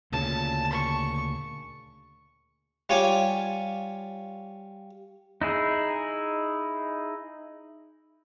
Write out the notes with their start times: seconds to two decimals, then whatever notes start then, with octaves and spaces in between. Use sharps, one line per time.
0.12 D2 A#2 C#3 A5
0.72 C#6
2.89 G3 F4 C#5 G5 G#5 D6
5.41 D#4 E4 G#4